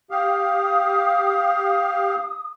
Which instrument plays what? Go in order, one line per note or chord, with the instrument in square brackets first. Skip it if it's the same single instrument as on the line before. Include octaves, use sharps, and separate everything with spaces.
[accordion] G4 F5 [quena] D#6